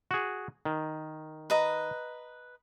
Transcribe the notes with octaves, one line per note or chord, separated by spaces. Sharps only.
F#4 G#4
D#3
B4 D#5 A#5